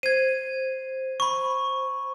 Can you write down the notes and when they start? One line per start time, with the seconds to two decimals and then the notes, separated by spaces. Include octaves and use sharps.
0.03 C5 G#6 D#7
1.20 B5 C#6